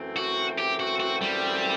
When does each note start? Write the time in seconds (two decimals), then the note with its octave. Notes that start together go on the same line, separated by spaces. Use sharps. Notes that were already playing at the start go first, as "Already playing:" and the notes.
Already playing: F#2 E3 A3 C4
0.16 F#4
0.58 G4
0.80 F#4
1.00 F#4
1.22 G3